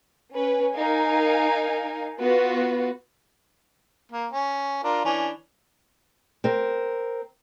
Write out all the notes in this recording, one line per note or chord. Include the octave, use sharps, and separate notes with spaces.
C#4 B4
D#4 A#4 F5 G#5
B3 F4 F#4 B4
A#3
C#4
D4 F4 A#4
E3 C#4 D4
C4 A#4